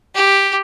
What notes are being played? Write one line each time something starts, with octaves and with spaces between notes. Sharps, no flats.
G4